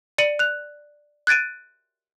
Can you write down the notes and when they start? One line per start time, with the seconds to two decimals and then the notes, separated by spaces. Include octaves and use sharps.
0.18 D5 C#7 D#7 F#7
0.39 F#6 F7
1.27 F#6 G#6 A6 D7 D#7